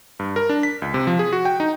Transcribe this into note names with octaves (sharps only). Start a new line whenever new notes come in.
G2
A#4
D4
B6
C#2
C3
F3
G#4
F#4
G5
D#4